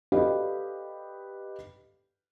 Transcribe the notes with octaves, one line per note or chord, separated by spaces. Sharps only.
G4 A4 B4 D5 D#5 F5